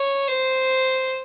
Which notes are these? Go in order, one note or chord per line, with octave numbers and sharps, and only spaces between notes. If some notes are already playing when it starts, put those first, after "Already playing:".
Already playing: C#5
C5